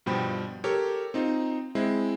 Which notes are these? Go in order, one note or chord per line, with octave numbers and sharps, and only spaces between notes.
G2 B2 F3 G5 B5
G4 A4 A#4 C#5
C4 D#4 F4
G#3 C4 E4